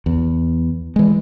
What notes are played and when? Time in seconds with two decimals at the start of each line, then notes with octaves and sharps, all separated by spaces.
0.06 E2
0.96 E3 G#3